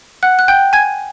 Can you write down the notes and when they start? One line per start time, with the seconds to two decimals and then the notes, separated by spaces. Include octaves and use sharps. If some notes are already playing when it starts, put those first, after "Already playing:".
0.23 F#5 F#6
0.39 F#6
0.48 G5 G6
0.73 G#5 G#6